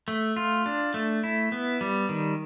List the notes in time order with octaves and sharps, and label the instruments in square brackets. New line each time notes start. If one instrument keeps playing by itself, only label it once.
[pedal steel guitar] A3
F4
D4
A3
E4
B3
G3
D#3